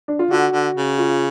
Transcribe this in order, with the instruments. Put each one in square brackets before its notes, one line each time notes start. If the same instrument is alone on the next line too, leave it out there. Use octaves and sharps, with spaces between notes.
[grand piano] D4
F4
[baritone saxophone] D3 [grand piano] F#4
[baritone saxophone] D3
C#3
[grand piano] F4